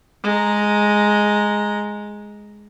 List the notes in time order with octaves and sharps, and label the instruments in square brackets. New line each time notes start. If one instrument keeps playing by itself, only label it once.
[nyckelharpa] G#3 A#5